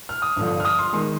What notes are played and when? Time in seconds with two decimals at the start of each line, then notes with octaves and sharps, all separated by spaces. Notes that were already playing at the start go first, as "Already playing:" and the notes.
0.09 F6
0.22 D#6
0.36 G1 G2 D3 F3
0.60 F6
0.65 D#6
0.79 C6
0.93 D#3 G#3 C6